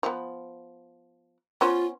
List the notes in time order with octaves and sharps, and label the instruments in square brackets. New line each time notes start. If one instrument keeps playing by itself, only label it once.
[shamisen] F3 B3
[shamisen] B3 C#4 C5 [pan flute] F4